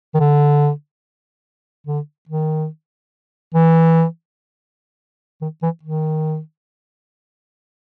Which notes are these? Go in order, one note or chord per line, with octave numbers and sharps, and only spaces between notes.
D#3
D3
D3
D#3
E3
D#3
E3
D#3